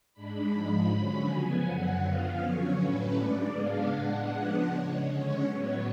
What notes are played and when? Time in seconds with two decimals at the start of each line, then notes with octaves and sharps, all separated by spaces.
0.13 G#2 G#3 D4 B5
0.51 G#2 F3 G#3 B5
0.89 D3 F#3 C#4 B5
1.27 C#3 F3 B3 G#5
1.64 F#2 D3 F#3 F#5
2.02 F#2 F3 B3 F5
2.40 D3 F#3 C#4 C#5
2.78 A2 F#3 A3 C#4 B4
3.16 G#2 G#3 D4 D5
3.53 C#3 G#3 B3 D4 F5
3.91 A2 G#3 D4 F#5
4.29 C#3 F3 G#3 B3 D4
4.66 C#3 G#3 C#4
5.04 D3 G#3 C#4 C#5
5.42 A2 F#3 B3 C#5